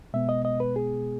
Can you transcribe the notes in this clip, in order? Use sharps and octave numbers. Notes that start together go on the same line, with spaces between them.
B2 G#3 B3 E5
D#5
D#5
B4
G#4